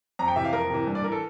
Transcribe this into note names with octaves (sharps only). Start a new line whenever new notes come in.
F2 A#5
G5
C3 E3 E5
F5
F2 A#4
C3 E3
G2
D5
E3 A#4
A4